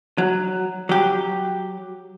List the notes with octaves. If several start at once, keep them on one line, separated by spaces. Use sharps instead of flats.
F#3
F#3 G4